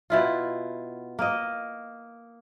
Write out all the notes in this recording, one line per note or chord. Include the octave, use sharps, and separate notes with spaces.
B2 E4 F4
A#3 D#5